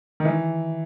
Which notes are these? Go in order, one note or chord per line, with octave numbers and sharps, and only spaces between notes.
D#3
E3